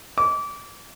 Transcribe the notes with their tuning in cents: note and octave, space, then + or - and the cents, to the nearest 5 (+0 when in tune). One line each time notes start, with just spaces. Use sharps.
D6 -25